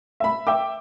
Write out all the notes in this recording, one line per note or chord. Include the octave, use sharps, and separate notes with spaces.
E5 B5
E5 G5 D6